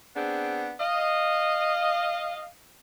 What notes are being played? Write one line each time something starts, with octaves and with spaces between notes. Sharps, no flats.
B3 C4 D4 G#4
D#5 F5